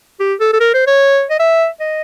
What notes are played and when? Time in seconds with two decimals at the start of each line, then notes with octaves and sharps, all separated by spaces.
0.20 G4
0.40 A4
0.53 A4
0.60 A#4
0.74 C5
0.87 C#5
1.30 D#5
1.40 E5
1.80 D#5